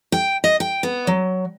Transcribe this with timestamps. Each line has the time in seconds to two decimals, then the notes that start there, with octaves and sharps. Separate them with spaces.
0.12 G5
0.44 D#5
0.60 G5
0.83 B3
1.07 F#3